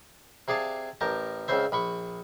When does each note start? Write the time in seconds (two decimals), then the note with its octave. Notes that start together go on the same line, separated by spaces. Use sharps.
0.48 C3 G#4 D5 F5 A5
1.01 A1 G4 A#4 A5
1.48 C#2 C#3 C4 C5 E5
1.72 A#1 B5 C#6